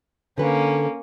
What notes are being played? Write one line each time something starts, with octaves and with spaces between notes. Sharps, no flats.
D3 A#3 C#4 B4